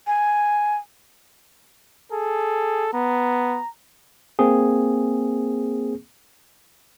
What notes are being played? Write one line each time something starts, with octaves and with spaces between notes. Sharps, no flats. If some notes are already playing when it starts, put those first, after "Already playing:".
G#5
G#4 A4
B3 A#5
A#3 C4 G#4